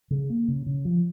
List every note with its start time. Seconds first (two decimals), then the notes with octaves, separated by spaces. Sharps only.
0.10 C#3
0.30 A#3
0.48 C#3
0.66 C#3
0.85 F3